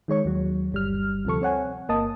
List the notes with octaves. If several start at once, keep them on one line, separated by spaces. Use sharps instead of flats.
D#3 G#3 C#5 C#6
D#2 F#3
G1 G3 F6
D2 C3 F3 A4 C#6
C4 C#5 F#5 G#5
G1 A#3 D#5 A5 D#6